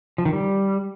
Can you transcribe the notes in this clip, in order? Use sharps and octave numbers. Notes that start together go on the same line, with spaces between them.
F3
D#3
G3